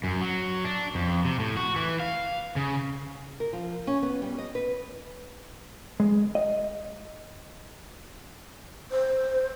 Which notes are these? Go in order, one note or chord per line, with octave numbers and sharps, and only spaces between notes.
F#2
F#3
D4
F2
C3
A2
F#4
E3
F5
C#3
A#4
F3
C#4
B3
G3
D#5
B4
G#3
D#5
C5